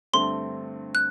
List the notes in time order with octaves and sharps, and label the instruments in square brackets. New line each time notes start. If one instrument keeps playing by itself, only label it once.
[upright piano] G2 D3 A3 C4 [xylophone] C6
[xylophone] F#6